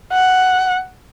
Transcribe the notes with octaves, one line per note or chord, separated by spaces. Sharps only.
F#5